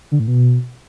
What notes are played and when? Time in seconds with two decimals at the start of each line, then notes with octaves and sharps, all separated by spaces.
0.12 D3
0.20 A2
0.28 B2